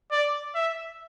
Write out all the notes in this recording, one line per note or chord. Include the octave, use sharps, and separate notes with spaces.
D5
E5